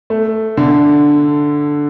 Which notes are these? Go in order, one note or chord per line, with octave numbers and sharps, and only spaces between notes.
A3
D3